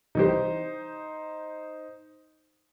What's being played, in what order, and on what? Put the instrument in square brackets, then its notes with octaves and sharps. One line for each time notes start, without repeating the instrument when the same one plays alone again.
[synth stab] C2 E3 G4 [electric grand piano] D#4 C5